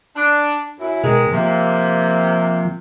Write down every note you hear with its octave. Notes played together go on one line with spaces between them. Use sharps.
D4
F#2 E4
B2 D#3 G#3
C3 F3 A#3